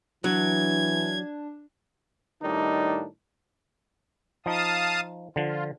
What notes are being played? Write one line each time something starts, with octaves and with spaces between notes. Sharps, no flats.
E3 F#3 D4 G#6
A2 D#3 G3 D4 D#4
F3 D#4 F5 A5 D#6
D3 F3 F4